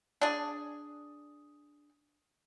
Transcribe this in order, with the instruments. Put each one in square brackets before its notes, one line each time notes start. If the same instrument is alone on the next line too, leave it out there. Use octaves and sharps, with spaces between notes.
[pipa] D4 G#4